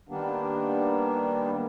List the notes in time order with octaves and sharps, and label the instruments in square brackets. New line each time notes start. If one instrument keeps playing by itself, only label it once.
[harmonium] D#3 G3 A#3 B3 D4